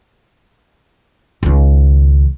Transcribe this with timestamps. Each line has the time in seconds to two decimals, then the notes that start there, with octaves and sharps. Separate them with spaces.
1.43 C#2 D#3